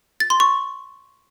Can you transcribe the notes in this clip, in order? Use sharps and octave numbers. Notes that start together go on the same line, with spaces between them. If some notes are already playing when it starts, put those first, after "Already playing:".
A6
C6
C#6